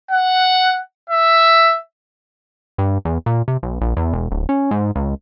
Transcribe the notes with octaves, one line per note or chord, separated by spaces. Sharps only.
F#5
E5
G2
E2
A#2
C3
B1
A#1
E2
E1
D1
C#4
G#2
C#2